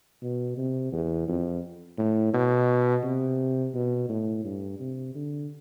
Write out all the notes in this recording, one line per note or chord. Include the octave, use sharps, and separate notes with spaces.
B2
C3
E2
F2
A2
B2
C3
B2
A2
G2
C3
D3